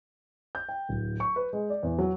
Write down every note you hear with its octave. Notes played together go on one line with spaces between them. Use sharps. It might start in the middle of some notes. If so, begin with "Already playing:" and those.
G6
G5
D1
C#6
B4
G#3
D5
E2
F#3